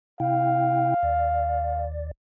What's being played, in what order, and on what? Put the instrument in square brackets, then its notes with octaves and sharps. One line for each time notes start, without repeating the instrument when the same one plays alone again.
[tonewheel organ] C3 E4 G5 [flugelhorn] F5
[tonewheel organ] D#2 D5